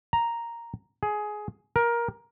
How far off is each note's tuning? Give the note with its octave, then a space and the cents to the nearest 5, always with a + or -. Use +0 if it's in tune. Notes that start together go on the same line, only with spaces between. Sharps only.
A#5 +0
G#4 +15
A#4 +15